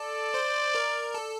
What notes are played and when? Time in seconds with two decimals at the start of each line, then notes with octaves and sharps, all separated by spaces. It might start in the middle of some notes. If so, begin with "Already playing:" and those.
Already playing: A4 D5
0.34 C5
0.75 A#4
1.14 A4